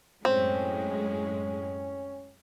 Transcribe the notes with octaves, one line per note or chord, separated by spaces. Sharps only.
F#2 A2 G#3 C4 C#4